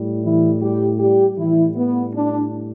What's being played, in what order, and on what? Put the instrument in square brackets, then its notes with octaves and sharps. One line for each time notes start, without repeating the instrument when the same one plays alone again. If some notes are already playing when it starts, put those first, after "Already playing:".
Already playing: [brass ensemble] A2 G3
E3 E4
G3 G4
G3 G4
A2 E3 G3 E4
B3
D4